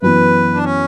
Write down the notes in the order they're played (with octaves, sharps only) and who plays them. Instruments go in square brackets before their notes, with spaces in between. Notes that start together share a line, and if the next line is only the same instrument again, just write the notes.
[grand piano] F#2 E3 B3 [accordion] B4
[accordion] D4
C#4